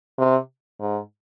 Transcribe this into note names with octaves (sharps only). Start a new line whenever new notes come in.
C3
G#2